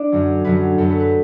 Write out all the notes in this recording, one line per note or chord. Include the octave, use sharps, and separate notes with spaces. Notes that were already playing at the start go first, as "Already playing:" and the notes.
Already playing: D4 D5
F#2 D3 F#3
F#2 D3 F#3 B4
F#2 F#3 B3 A4
B4
B4